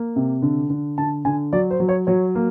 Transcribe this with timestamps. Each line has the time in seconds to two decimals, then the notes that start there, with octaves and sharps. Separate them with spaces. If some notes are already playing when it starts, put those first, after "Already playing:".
Already playing: A#3
0.16 C3
0.42 D3
0.70 D3
0.98 D3 A5
1.25 D3 G#5
1.53 F#3 D5
1.71 C5
1.80 F#3
1.89 C#5
2.07 F#3 C#5
2.35 A#3